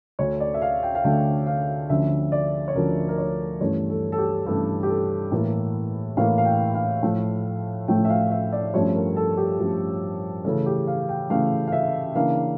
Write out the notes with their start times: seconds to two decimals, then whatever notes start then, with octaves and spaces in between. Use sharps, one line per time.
0.19 D2 D3 A3 C#5
0.40 D5
0.54 E5
0.62 F5
0.83 G5
0.95 F5
1.04 D2 D3 A3 G5
1.47 F5
1.90 D2 D3 F3 C#4 E5
2.32 D5
2.68 C#5
2.75 D2 D3 F3 C#4 A#4
3.09 A#4
3.18 C#5
3.61 G2 E3 A3 C#4 C#5
3.90 A4
4.12 A4
4.18 G4
4.46 G2 E3 A3 C#4 A4
4.83 G4
4.89 A4
5.32 A2 E3 A#3
6.17 A2 E3 A#3 F5
6.38 F5
6.45 G5
6.74 F5
7.03 A2 F3 A3
7.88 A2 F3 A3 G5
8.05 E5
8.10 F5
8.31 E5
8.53 D5
8.73 G2 F3 A3 C#4 C#5
8.95 A#4
9.16 A4
9.37 G4
9.59 G2 F3 A3 C#4
10.44 C#3 E3 A3 C#4 A4
10.66 G4
10.87 F5
11.09 G5
11.30 C#3 E3 A3 C#4 F5
11.67 F5
11.72 E5
12.15 C#3 E3 A#3 D4 F5